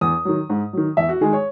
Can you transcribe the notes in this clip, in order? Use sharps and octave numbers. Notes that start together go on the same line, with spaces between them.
E2 D#6
D#3 F#3
G#2
D#3 F#3
E2 E5
F#4
D#3 G#3 G#4
C#5